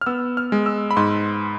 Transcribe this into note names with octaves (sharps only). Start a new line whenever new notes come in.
F6
B3 E6
F6
G#3
E6
B5
G#2 C6